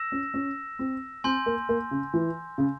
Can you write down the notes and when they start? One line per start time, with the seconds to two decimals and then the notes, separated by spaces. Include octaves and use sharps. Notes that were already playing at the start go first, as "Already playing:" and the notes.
Already playing: E6 A#6 E7
0.12 C#4
0.34 C#4
0.79 C4
1.24 C4 G#5 C6 G6
1.46 A#3
1.69 A#3
1.91 C#3
2.14 E3
2.58 C#3